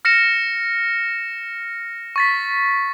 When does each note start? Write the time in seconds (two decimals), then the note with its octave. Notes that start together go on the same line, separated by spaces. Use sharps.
0.05 F6 A#6 C#7 E7
2.16 C#6 A6 B6